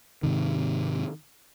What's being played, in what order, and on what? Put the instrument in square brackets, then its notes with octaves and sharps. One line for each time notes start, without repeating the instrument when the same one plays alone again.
[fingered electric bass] G#2 C3 D#3